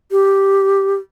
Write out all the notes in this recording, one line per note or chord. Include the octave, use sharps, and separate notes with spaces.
G4